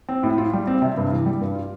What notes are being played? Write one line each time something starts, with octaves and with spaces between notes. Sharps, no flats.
C4
A2
F4
G3
C4
C3
G2
E3
G3
G2
F4